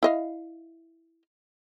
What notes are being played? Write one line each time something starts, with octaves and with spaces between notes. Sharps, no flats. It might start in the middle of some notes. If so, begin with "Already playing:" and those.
E4 D#5 F5